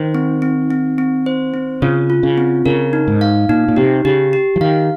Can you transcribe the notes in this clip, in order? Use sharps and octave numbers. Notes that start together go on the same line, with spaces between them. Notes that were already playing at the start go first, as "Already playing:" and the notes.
Already playing: D#3 C5
C4
C4
C4
C4
C5
C4
C#3 F4
F4
C#3
C4
C#3 A#4
D#4
G#2
F5
A#2 D#4
A#2
C3 G4
C#3 G4
G4
F3
D#3 F5